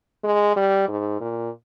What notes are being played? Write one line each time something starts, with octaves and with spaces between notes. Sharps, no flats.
G#3
G3
G#2
A#2